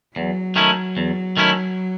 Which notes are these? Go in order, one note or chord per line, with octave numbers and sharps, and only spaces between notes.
E2 F#3
D#3 A3 C#4 E4
E2
D#3 A3 C#4 E4